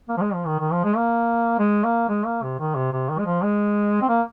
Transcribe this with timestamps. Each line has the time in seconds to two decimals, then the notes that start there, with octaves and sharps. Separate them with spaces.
0.09 A#3
0.17 F3
0.21 G#3
0.34 F3
0.47 D#3
0.60 D#3
0.72 F3
0.84 G#3
0.97 A#3
1.59 G#3
1.85 A#3
2.09 G#3
2.26 A#3
2.43 C3
2.59 D#3
2.75 C3
2.93 C3
3.09 D#3
3.19 G#3
3.26 F3
3.43 G#3
4.02 C4
4.09 A#3